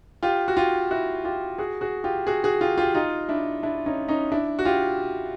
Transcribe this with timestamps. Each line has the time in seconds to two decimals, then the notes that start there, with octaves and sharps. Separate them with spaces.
0.23 F4 G4
0.48 F#4
0.56 F4 G4
0.91 E4 F#4
1.25 F4 G4
1.58 F#4 G#4
1.81 F#4 G#4
2.04 F4 G4
2.27 F#4 G#4
2.44 F#4 G#4
2.61 F4 G4
2.78 F4 G4
2.94 D#4 F4
3.29 D4 E4
3.63 D4 E4
3.86 C#4 D#4
4.08 C#4 D#4
4.32 D4 E4
4.59 F#4
4.65 F4 G4